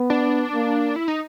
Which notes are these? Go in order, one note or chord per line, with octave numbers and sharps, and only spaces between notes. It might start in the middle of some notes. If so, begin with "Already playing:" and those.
Already playing: B3
D4
A#3
E4
D#4